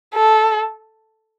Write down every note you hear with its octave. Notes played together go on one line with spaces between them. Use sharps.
A4